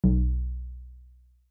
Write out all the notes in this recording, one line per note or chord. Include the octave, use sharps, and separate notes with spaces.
B1